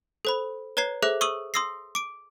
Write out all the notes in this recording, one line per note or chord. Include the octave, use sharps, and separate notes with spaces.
A4 C5 B5
B4 C#5 A#5 G#6 C7
G#4 A4 C5 E5 D6 F#6
C#6 D#6 E6 D#7 F#7
C6 D#6 E6 A#6 C7
D6 D7